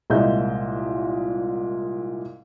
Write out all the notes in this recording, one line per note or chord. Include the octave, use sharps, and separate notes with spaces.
C2 A#2 G#3 D#5 E5 G6